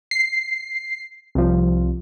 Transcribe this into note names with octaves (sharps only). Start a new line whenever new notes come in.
C7
C2 F3